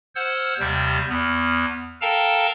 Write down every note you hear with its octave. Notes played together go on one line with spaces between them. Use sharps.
C5 F#5 E6 F6 G6 G#6
D#2 C3 G3 G6
E2 B3 F6
A4 A#4 F5 G5 A5 A#5